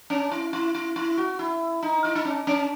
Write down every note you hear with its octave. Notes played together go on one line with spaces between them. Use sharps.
C#4
E4
E4
E4
E4
F#4
E4
D#4
E4
D#4
C#4
C#4